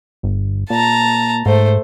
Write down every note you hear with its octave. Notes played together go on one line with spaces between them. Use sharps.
G1
A#2 A5 A#5
G#2 A3 C5